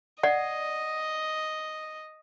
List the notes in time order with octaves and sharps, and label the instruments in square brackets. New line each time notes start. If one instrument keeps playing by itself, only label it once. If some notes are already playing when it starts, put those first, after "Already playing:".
[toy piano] D5 F#5 [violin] D#5